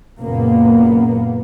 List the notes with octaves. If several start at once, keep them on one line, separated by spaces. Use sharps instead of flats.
F#1 C#2 A#2 A#3 B3